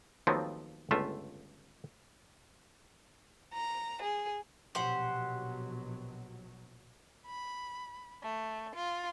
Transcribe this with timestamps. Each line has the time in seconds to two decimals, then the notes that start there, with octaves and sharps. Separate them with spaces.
0.27 D#2 F3 F#3 A3 B3 C4
0.91 G1 C#2 A3 F4 E5
3.54 A#5
4.01 G#4
4.75 A#1 B2 F#3 G4 C5 F#5
7.25 B5
8.22 A3
8.75 F4